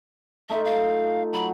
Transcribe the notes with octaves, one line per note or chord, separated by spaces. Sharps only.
A3 D#4 F4 E5
F5
F#3 B5